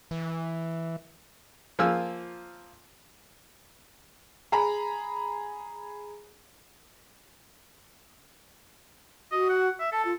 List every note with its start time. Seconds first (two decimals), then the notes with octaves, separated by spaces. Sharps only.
0.11 E3
1.79 F3 A#3 F4 G#5 E6
4.52 G#4 A#5 B5
9.32 F#4 D#5
9.49 F#5
9.80 E5
9.92 A4 A5
10.05 F4